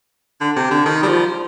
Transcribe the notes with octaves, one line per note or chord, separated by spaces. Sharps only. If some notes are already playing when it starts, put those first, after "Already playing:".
D3
C3
D3
D#3
G3
F3